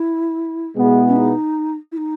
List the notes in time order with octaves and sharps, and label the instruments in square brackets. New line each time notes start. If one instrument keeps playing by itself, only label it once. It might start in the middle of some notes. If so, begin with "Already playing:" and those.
Already playing: [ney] E4
[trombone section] B2 G#3 B3 E4 G#4
[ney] C#4
D#4
E4
D#4